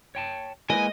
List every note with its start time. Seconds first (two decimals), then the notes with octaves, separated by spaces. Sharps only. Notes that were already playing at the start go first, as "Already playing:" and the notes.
0.15 C#5 G5 A5
0.70 G#3 A#3 E4 B4 D#5 G#5